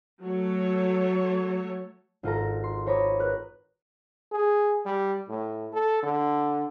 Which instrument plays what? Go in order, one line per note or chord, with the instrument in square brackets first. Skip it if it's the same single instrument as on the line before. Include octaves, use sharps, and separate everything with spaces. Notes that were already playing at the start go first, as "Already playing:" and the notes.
[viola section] F#3 A3 A4 C#5
[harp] G#1 F4 A4 A#5
C6
C5 C#5 A#5 B5 D6 D#6
A#4 B4 F#6
[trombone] G#4
G3
A2
A4
D3